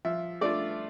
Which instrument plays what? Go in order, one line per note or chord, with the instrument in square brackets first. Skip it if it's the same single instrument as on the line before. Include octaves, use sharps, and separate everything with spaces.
[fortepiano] F3 E5
A3 D4 F4 D5